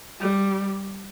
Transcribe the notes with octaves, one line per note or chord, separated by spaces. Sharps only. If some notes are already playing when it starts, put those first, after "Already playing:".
G3